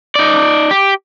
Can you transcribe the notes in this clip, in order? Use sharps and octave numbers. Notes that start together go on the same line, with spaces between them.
D#4 D5
G4